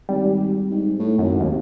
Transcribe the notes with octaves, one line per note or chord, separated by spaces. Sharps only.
G#1 G3
G#2
A2
G#1 F#2
D#2